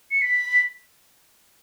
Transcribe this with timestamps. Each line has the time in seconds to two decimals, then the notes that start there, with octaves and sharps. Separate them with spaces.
0.11 C#7
0.22 B6